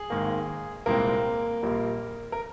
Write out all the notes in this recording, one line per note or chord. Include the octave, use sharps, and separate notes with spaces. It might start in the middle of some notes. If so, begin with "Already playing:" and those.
Already playing: G#4
G#1 G#2 D#3 A#3
C2 A#2 G#3 A#3 C4 A#4
A#1 A#2 G3 A#3
A#4